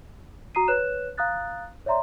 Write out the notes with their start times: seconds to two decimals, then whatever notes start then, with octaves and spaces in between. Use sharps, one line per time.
0.55 F#4 A#5 D#6 C7 D#7
0.68 B4 C#5 F#6 E7
1.18 F5 A#5 D#6 F#6 A6
1.86 C#5 D5 E5 A#5 C6